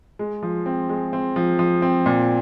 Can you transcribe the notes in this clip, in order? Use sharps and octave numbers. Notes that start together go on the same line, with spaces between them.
G#3
F3
C4
G#3
C4
F3
F3
C4
A#2